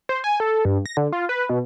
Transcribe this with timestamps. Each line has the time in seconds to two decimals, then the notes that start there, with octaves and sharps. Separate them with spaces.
0.09 C5
0.24 G#5
0.40 A4
0.65 G2
0.86 A#6
0.97 D3
1.13 F4
1.29 B4
1.49 B2